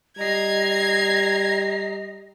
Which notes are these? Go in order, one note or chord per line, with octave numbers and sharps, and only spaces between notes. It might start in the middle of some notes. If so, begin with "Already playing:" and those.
G3 D#5 A#5 G#6 C7